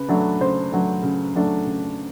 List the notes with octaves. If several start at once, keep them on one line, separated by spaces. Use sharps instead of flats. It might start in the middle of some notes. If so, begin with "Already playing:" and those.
Already playing: C#3 B4
F#3 A3 D4
C#3 C5
F#3 A3 D4
C#3
F#3 A3 D4
C#3